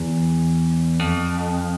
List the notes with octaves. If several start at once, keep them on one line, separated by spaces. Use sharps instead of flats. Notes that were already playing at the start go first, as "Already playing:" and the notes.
Already playing: E2
F2